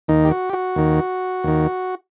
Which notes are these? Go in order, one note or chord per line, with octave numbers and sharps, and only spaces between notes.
D#2 D#3 D#4
G4
F#4
G4
F#4
D#2 D#3
D#2 D#3